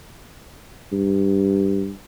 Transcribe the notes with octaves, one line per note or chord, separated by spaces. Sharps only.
G2